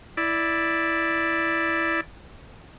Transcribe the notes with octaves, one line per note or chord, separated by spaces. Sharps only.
E4 D5